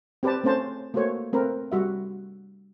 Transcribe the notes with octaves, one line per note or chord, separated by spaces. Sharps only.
C4 G4 B4 D5 A5
A3 C4 C#4 C5 A5
A3 A#3 F#4 C5 C#5
A3 C4 A#4 B4
G3 F#4 E5